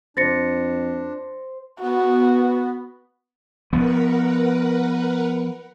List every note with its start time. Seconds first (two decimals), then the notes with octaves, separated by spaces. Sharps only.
0.17 F2 D4 C5 A6 A#6 C#7
1.82 B3 F#4
3.73 F3 B3 A#4 B4 F#5